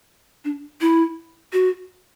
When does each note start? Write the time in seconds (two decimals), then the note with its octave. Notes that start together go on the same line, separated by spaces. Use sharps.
0.45 D4
0.81 E4
1.53 F#4